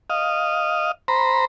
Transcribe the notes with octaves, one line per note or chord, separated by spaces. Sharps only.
D#5 F5
C5 A#5 B5